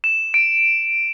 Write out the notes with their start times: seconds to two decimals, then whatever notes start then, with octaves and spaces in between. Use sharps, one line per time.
0.04 E7
0.34 D7